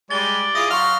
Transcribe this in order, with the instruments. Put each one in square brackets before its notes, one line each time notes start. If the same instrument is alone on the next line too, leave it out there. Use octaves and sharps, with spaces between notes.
[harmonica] G3 G#3 [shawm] D5 [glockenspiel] A6 G7
[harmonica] E4 F4 G#4 [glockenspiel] D#6 A#6
[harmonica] F#3 F6 [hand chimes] F5 C6 C#6